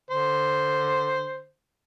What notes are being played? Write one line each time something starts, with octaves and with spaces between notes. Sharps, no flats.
D3 C5